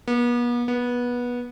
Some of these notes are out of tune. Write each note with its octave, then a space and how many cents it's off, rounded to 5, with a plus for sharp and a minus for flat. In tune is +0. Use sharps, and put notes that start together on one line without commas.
B3 -40
B3 -20